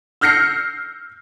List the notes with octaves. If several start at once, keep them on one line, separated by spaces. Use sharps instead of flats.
E6 F6 G6 A#6 C7 C#7